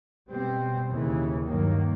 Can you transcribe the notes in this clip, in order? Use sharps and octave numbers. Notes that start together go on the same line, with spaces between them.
B2 G3 C4
D#2 C#3 E3
G2 D#3 F#3 A#3